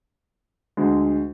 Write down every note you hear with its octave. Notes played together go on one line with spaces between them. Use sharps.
D2 D3 G#3